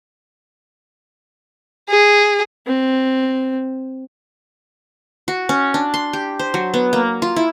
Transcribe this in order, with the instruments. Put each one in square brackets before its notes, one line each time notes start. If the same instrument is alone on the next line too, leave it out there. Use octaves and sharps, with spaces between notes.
[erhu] G#4
[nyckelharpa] C4
[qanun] F#4
C#4
D4
C6
G4
C5
F#3
B3
A#3
F4
E4